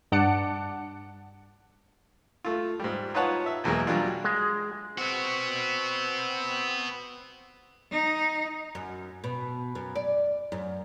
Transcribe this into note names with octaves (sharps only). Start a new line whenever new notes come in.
G2 D4 F#5 A5 D6 C#7
A3 F4
G#2 G3
D#4 F4 B4 C#5 F#5 A5
E5
B1 E2 F#3 G#3 A#3
F#3 G3 D4 F4
G#3
B3 C4 F#4
D#4
F#2
B2
F#2
D5
F#2